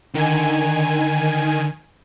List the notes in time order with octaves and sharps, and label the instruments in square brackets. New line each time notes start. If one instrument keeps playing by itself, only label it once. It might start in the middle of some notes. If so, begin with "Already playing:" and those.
[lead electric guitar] D3 [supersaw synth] D#3 G#5